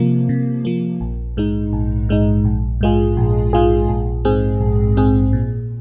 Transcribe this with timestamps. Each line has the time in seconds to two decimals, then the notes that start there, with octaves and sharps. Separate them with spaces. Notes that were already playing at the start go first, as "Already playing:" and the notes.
Already playing: C3 F3 A#3
0.29 C3
0.65 F3 A#3
1.01 A#1
1.37 G#2 G#3 D#4
1.73 A#1
2.09 G#2 G#3 D#4
2.45 A#1
2.81 G#2 G#3 F4 G#4
3.17 A#1
3.53 G#2 G#3 F4 G#4
3.89 A#1
4.25 G#2 G#3 C4 G#4
4.61 A#1
4.97 G#2 G#3 C4 G#4
5.33 A#2